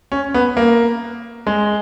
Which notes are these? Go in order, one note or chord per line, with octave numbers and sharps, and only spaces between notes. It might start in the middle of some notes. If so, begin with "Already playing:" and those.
C#4
B3
A#3
G#3